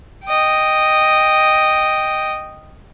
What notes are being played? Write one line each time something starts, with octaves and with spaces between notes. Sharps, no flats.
D#5 G5